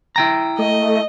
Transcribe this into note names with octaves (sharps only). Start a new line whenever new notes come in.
E4 G5 A#5
A3 D#5